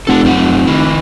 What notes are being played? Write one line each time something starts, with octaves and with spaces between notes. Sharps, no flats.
F1 A4 F#5 A5
F#2 C4 F#5
F1
D#3 D#4 E4